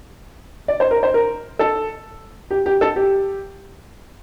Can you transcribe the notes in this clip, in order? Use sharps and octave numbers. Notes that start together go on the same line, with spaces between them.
D5
C5
A#4
C5
A#4
A4
G4
G4
A4
G4